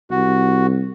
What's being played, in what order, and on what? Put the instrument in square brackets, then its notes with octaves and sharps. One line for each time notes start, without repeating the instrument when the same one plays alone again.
[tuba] C2 [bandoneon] F#4